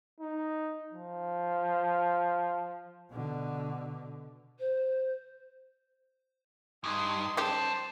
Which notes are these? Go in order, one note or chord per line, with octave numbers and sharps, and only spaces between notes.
D#4
F3
B2 D3
C5
G2 D#4 G#4 C6
C#3 G3 G4 C5 A5